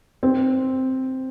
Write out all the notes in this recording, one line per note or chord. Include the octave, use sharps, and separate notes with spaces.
C4